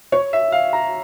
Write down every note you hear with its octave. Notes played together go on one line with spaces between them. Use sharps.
C#5
E5
F5
A#5